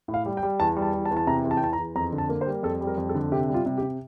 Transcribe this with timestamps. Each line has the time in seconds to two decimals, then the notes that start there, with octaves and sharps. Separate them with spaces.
0.08 A2
0.14 F5
0.26 G3
0.37 G5
0.43 G3
0.60 E2 A5
0.77 G3
0.82 A5
0.93 E2
1.05 A5
1.11 E2
1.17 A5
1.27 C3 A#5
1.44 E2
1.51 A5
1.57 G5
1.62 E2 A5
1.73 A#5
1.78 E2
1.96 F2 A#5
2.13 D3
2.18 A5
2.29 A#3
2.41 C5
2.47 G3
2.63 F2 A4
2.81 G3
2.87 A#4
2.98 F2
3.09 A4
3.15 D3
3.32 C3 G4
3.49 G3
3.54 F4
3.66 C3
3.78 G4
3.83 C3